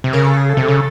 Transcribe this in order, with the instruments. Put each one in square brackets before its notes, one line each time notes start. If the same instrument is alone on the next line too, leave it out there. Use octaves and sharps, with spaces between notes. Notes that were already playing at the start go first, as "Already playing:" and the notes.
[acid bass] C3
[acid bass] C#3 [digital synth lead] A#4
[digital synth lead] A4
G#4
A4
[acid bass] C3
C#3